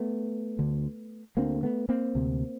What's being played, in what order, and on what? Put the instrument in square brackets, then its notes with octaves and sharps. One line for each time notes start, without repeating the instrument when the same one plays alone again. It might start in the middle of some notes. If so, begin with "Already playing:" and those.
Already playing: [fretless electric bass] A3 B3
D2 D3
D2 D3 A#3 C4
A3 B3
A#3 C4
D2 C3